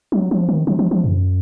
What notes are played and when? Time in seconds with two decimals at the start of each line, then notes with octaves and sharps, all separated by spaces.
0.12 F#3
0.31 F3
0.49 D#3
0.67 F3
0.79 F3
0.91 F3
1.04 F#2